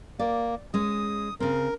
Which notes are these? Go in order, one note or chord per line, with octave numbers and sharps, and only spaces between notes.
A#3 D5
G#3 C#4 D#6
C#3 C4 A#4